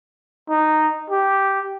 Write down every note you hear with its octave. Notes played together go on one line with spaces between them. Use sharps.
D#4
G4